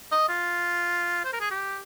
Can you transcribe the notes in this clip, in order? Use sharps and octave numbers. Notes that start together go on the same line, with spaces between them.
D#5
F4
C5
A#4
G#4
G4